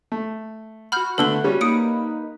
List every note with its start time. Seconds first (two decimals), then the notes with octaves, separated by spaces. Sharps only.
0.12 A3
0.92 F#4 F#5 B5 F6 G6
1.18 D3 A3 B3 A4 E6 G7
1.44 G3 C#4
1.61 A#3 D#4 B4 D#6 C#7 D7